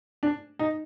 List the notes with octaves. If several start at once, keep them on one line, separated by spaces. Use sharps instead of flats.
D4
D#4